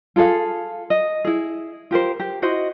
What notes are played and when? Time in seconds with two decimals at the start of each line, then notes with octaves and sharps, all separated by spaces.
0.16 F4 G#4 A4 F5
0.90 D#5
1.25 E4 G#4
1.91 F4 G4 A#4 C5
2.20 G4
2.42 E4 F#4 C5 D#5